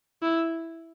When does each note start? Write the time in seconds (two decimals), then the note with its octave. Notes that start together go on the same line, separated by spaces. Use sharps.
0.22 E4